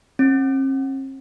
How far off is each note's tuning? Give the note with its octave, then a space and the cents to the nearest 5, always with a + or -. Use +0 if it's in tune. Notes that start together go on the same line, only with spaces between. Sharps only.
C4 +45